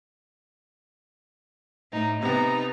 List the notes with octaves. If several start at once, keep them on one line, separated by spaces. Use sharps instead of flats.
A2 D#4
C3 B3 D#4 A#5